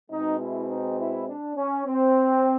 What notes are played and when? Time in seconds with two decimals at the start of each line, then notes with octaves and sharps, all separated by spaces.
0.10 B2 G#3 C4 D#4
0.40 E4
0.70 D#4
0.99 E4
1.28 D4
1.57 C#4
1.86 C4